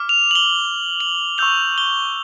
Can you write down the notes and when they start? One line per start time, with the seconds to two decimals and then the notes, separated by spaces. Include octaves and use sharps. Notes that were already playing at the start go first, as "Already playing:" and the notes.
Already playing: D6 F6
0.09 F7
0.31 F#7
0.35 G7
1.00 F#7
1.38 C#6 E6 G6 F7
1.78 G7